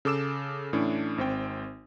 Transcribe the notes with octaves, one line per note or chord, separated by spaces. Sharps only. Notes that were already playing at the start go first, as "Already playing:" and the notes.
C#3 A4 D6 E6 E7
A2 E3 C#4 D4
G#1 C4 G5